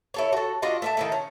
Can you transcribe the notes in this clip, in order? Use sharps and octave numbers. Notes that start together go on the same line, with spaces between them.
E4 A4 C#5
F#4 A4
D4 F4 F#4 D#5
A3 E5 A5
D#3 E4 A4
C#4